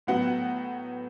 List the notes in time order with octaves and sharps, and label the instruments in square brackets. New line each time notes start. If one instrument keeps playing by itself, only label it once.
[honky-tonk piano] A2 F#3 B3 F#5